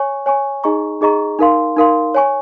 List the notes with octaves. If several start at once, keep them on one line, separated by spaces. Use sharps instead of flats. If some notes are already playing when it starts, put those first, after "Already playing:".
Already playing: C#5 G#5 C#6
C#5 G#5 C#6
D#4 G#4 D#5 A#5 C#6
D#4 G#4 D#5 A#5 C#6
D#4 A#4 F5 C6
D#4 A#4 F5 C6
C#5 G#5 C#6